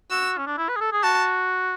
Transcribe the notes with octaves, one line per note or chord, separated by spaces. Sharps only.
F#4 E6
C#4
D4
E4
B4
G#4
A4
G#4
F#4 A5